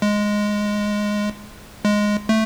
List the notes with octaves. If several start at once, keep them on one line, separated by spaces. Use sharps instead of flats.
G#3
G#3
A3